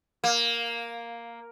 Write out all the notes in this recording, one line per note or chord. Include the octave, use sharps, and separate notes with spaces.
A#3